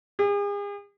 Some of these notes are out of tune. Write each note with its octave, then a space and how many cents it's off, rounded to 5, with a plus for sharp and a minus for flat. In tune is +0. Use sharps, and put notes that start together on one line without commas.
G#4 -40